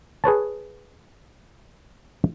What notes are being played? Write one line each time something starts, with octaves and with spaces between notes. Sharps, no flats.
G#4 B4 C#5 A5